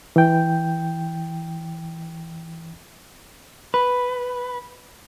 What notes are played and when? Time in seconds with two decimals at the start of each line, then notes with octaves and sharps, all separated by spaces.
0.16 E3 G5
3.74 B4